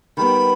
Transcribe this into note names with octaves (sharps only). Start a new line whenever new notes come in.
D#3 G3 B3 B5